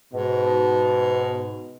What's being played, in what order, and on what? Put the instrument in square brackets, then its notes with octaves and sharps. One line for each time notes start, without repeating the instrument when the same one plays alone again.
[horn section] G#2 B2